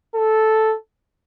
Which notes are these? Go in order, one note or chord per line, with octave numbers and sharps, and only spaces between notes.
A4